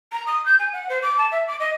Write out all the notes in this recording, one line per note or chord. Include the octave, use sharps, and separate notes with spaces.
A#5
D#6
G6
G#5
F#5
C5
D6
A5
E5
D6
D#5